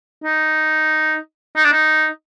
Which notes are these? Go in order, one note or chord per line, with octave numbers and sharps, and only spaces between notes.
D#4
D#4
D4
D#4